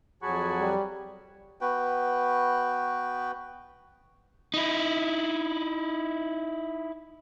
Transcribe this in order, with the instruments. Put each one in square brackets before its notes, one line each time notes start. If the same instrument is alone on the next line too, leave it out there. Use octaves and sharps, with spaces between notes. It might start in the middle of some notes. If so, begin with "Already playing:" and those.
[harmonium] F2 F#3 G#5 [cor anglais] F#4 [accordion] G#4 A5 B5
[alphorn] G3
[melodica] B3 F#4 B4 G5
[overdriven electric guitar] D#4 E4